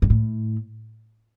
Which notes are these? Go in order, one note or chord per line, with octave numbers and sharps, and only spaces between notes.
G2
A2